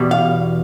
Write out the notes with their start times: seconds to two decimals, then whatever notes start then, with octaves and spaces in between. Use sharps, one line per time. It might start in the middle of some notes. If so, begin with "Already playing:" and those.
Already playing: E2 B2 G3
0.11 F5